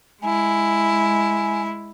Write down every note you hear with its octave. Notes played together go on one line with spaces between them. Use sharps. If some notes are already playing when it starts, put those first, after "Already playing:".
G#3 E4 G#5